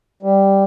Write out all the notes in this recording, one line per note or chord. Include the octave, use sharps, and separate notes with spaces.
G3